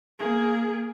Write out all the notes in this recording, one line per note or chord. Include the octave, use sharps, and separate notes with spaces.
A#3 G#4